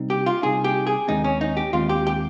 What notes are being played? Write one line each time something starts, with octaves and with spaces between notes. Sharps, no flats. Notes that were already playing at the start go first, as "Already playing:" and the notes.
Already playing: C3 G3 C4 D#4
G4
F4
C3 G3 C4 D#4 G#4
G4
G#4
D#2 D#3 G#3 C4 D#4
C#4
D#4
G4
D#2 D#3 G#3 C4 F4
G4
G4